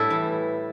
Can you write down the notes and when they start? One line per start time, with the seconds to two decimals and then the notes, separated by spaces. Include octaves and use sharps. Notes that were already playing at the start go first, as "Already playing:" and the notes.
Already playing: A2 G3 E4 A4
0.10 E3